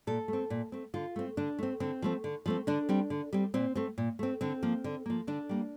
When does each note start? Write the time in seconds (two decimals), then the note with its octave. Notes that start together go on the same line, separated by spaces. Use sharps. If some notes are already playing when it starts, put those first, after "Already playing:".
0.07 A#2 A4
0.28 A3 C4
0.50 A#2
0.72 A3 C4
0.94 D3 F4
1.16 A3 C4
1.37 D3 D4
1.59 A3 C4
1.80 D3 C4
2.02 F3 A3 C4
2.24 D3
2.46 F3 A3 C4
2.67 D3 D4
2.89 G3 C4
3.10 D3
3.33 G3 C4
3.54 A#2 C4
3.75 A3 C4
3.98 A#2
4.19 A3 C4
4.41 D3 C4
4.63 F3 A#3
4.84 D3
5.06 F3 A#3
5.27 D3 D4
5.49 G3 A#3